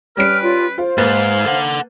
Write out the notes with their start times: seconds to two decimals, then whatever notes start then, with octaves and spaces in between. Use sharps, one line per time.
0.17 G3 C#4 B4 F6 D7
0.43 F4
0.78 F4 C5
0.98 G#2 A#3 B4 F5 A6
1.46 A4 F#5